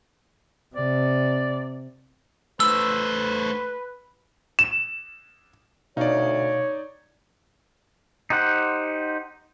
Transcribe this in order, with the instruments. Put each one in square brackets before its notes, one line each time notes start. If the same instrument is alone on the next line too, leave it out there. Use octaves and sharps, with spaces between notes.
[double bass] C3 [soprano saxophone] D5
[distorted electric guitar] A3 C5 [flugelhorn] B4 [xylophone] E6
[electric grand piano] E7
[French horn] D2 [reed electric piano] B2 F5 [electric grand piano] D#4 D5 [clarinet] C#5
[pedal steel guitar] D#4 G4 C5 F#5